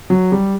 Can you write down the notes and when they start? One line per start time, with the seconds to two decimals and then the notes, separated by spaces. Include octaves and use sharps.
0.10 F#3
0.32 G3